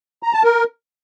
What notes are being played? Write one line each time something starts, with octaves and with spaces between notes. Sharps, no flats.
A#5
A5
A#4